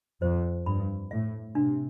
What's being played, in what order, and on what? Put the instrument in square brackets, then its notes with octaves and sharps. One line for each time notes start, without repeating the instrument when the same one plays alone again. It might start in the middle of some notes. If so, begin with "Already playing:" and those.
[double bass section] F2 [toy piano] C5
[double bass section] G2 [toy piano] B5
[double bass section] A2 [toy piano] E5
[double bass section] C3 [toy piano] D4